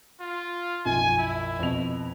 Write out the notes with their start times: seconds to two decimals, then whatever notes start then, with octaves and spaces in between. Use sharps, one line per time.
0.20 F4
0.85 B1 F#2 F3 G#5
1.18 E4
1.59 F2 B2 F7